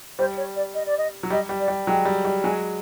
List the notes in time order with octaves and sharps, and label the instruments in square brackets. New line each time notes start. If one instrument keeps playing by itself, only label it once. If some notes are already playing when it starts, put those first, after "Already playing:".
[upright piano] G3 [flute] C5
[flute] C#5
D5
D#5
D5
D#5
[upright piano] F#3
[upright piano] G3 [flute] D#5
[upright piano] G3
[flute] D5
[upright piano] G3
[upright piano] F#3 G#3 [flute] G5
[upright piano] G3
G3
[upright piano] F#3 G#3 [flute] G#5